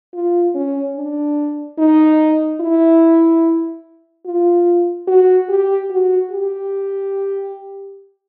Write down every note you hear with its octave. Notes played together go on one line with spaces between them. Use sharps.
F4
C#4
D4
D#4
E4
F4
F#4
G4
F#4
G4